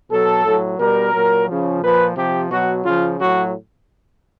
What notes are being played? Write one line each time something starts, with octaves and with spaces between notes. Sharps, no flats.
B2 F#3 A4
A2 F#3
B2 G3 A#4
A#2 F#3
C#3 F3
A#2 F3 B4
C3 F3 G4
B2 F#3 F#4
C#3 F3 F4
A2 F#3 F#4